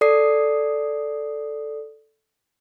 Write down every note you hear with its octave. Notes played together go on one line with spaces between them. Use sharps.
A4 D5 D#6 C7